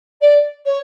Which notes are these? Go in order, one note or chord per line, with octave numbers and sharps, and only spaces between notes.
D5
C#5